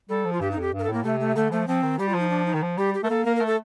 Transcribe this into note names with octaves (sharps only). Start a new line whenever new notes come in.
G3 A4
F3
F4
G2 G4
D#4
F2 G4
G2
A#4
A4
A2 A#3
C3 A3
A3
D3 A3
F3 A3
F3 C4
D#3
G3 G4
F4
F3
D#4
D4
D#4
D#3
F3
G3 G4
G4
A3 A#4
A#3 A4
A#3 A#4
A#4
A3
A4